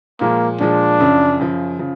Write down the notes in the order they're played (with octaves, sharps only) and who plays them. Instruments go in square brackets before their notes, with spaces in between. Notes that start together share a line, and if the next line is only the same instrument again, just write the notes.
[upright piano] A#2 F3 G#3 [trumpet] A#3
[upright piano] A#2 F3 G#3 [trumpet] D4
[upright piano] F#2 C#3 F3
F#2 C#3 F3
C#3 F3